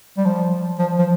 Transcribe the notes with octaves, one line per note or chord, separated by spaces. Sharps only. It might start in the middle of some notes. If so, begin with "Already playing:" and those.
G3
F3
F3
F3